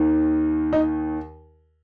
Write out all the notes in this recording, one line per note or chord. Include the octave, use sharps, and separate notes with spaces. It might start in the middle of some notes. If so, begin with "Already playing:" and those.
Already playing: D#2 D#3
D#4